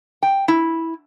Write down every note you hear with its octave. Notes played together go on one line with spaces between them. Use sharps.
G5
E4